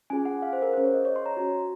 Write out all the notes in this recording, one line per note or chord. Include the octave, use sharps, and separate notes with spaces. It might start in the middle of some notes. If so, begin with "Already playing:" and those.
C#4 F4 G#4 G#5
F#5
F5
C5
A#4
C#4 G#4 C5
C#5
D#5
C#5
C6
A#5
C#4 F#4